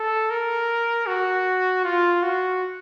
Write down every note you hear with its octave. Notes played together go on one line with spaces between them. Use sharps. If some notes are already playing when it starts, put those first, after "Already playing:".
Already playing: A4
A#4
F#4
F4
F#4